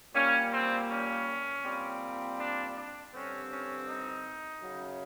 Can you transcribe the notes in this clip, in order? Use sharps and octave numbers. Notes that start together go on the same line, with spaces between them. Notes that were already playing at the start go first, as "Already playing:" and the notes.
A#2 G3 A#3 C#4
C4
C#4
A#2 G3 C4
D4
D4
G2 D3 G3 C4 C#4
C#4
D#4
F#2 C#3 F#3